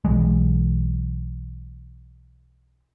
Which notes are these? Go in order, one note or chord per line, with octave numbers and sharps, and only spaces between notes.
B1 E3 G#3